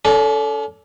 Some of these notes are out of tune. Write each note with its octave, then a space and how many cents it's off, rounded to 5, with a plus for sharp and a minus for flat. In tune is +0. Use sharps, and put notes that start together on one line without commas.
C#4 +45 A4 +0 D5 +0